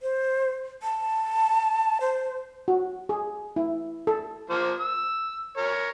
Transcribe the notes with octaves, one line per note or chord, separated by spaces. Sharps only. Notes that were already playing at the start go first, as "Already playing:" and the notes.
C5
A5
C5
F#4
G#4
E4
A4
F3 A#3 C5
E6
A#4 C#5